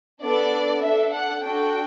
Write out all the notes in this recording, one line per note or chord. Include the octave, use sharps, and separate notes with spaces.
B3 D4 A4 D5
D4 A4 E5
F#5
D4 F#4 A4 G5